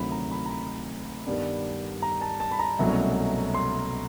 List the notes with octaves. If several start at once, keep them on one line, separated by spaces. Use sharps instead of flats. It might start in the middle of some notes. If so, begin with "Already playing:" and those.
Already playing: D2 C3 D#3 F#3 B5
A#5
B5
A#5
B5
G2 D#3 G3 B3 D4
A#5
A5
A5
B5
A#5
C2 B2 F#3 A3 C#4
C6